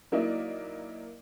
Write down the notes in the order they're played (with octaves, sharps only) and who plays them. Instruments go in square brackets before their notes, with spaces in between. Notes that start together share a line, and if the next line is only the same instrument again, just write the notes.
[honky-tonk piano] F#3 A#3 D#4 E4 D5 D#5